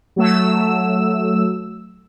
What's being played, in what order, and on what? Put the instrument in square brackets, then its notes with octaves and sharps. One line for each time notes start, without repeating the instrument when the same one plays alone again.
[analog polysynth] F#3 A3 E6